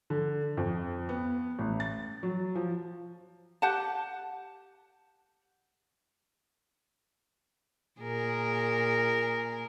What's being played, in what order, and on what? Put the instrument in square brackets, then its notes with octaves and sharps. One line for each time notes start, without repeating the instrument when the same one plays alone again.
[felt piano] D3
F2
B3
A1
A6
F#3
F3
[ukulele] G4 F#5 A5
[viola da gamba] A#2 G#4 A#4